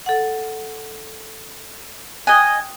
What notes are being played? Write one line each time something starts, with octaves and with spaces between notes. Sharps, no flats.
A4 F#5
D#5 G5 G#5 D#6 F#6